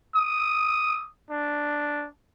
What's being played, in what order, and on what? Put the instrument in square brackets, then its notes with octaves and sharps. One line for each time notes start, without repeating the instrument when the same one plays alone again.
[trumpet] D#6
D4